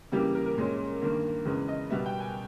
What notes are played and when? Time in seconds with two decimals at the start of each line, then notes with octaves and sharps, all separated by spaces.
0.12 C#3 E3 G3 A#3 G4
0.35 A#4
0.46 A#4
0.57 A#2 G#3 C#4
1.02 G2 D#3 A#3
1.46 E2 C#3 G#3 B4
1.68 D#5
1.90 B2 G3 B3 E5
2.06 G5
2.20 G#5